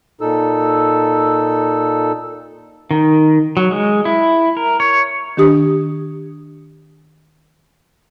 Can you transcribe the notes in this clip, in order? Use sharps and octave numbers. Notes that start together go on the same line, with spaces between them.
A#2 D#4 A4 E6
D#3
F#3
G#3
E4
A#4
C#5
D#3 D4 G4 D#6